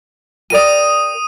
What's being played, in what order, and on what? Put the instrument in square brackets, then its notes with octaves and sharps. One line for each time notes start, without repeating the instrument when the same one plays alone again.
[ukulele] G4 A#4 D5 [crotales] D#6 D#7